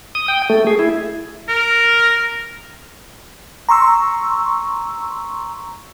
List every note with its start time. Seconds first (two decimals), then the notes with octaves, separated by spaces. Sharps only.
0.15 D#6
0.28 G5
0.50 A3
0.67 G#4
0.79 E4
1.48 A#4
3.69 A#5 C6 C#6 E6